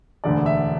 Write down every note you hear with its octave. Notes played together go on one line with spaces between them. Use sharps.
E1 D2 D3 D5
E5